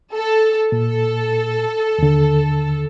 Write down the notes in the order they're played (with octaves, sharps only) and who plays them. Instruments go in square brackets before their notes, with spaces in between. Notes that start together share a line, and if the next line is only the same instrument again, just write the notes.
[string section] A4
[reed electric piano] A#2 [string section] A4
[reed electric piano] D#2 D3